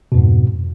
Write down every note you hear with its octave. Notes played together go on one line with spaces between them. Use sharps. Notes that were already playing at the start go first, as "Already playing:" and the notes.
F2 G#2 B2